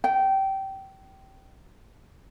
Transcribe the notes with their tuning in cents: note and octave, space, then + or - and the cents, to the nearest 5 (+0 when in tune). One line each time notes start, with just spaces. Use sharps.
G5 -20